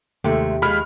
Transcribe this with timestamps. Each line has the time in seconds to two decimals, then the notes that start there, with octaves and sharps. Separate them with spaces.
0.24 D#2 C3 G#3 A3 G4
0.62 D#3 F3 G#3 B5 F6